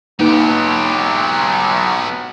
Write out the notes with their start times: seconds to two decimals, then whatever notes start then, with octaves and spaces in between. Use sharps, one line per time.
0.20 B1 A#3 B3 D#4 G4 B4